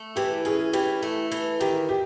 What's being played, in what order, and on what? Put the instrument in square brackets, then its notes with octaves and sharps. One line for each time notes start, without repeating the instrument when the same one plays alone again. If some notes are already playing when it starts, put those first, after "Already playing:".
Already playing: [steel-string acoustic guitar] A3
[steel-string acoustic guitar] E3 [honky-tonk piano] G4
[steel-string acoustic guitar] C#4 [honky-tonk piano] G#4
[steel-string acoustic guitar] E3 [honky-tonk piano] G4
[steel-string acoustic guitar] A3
E3
[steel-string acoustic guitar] D#3 [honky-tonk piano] G4
[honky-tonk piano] G4